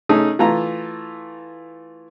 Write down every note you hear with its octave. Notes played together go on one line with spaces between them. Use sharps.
A3 C#4 D#4 G#4
E3 A3 F4 A#5